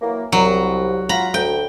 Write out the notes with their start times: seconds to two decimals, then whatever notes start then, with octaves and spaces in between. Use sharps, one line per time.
0.02 E3 F#3 A#3
0.32 C2 F#3
1.09 F4 F#5 A#5 B5
1.34 D2 G5